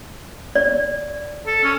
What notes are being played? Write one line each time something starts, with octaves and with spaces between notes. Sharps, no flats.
D5
A4
C#4